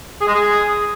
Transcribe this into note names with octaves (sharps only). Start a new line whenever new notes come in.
G#4
G#3
G#4